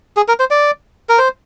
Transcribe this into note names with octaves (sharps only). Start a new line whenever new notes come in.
G#4
A#4
C5
D5
A#4
C5